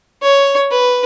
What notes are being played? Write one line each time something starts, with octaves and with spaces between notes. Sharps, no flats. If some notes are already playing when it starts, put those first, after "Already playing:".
C#5
B4